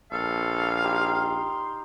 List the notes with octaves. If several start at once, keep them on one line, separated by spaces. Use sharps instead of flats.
A#1 A4 F5
D#4 G4 B5 C6